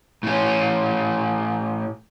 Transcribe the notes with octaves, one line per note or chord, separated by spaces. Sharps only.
A2 C#4